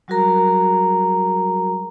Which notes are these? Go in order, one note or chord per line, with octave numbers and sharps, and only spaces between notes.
F#3 G3 F#4 G#4 A#4 A#5